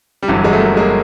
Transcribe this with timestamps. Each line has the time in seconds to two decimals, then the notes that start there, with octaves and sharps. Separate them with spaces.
0.22 G3
0.28 G1 G2 E3 F#3
0.44 F#3 G#3
0.53 A3
0.60 G#3 A#3
0.77 G#3 A#3